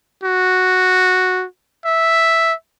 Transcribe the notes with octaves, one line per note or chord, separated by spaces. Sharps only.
F#4
E5